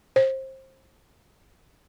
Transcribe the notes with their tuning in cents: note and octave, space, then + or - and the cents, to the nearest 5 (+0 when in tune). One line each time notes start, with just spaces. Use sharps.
C5 +25